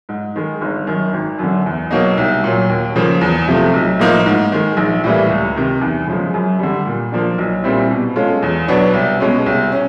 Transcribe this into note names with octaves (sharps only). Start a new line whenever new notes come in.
G#2
D#3 G#3
G1
F#2 D#3
G#1
F#2 D3
E2
B2 F#3 A#3 D#4
C2
A#2 F#3
D#2
C#3 F3 A#3
E2
C3 F3 A3
B1
A2 F3 A#3 D#4
G#2
D#3 G#3
A#1
A2 E3 G3 A#3
C#2
C3 D#3
E2
C#3 F3 G#3
F#2
D3 G3
A#2
F3 A#3 D4
B1
A#2 G3 C4 E4
B2
G#3 C#4 F4 A4
E2
B2 F#3 B3 D4
C2
B2 G#3 C#4
C2
C#4